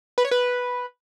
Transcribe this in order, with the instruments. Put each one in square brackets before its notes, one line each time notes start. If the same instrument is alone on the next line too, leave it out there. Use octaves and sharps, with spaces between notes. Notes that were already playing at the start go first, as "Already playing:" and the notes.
[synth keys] B4
C#5
B4